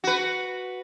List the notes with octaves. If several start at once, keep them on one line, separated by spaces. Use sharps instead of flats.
F#4 B4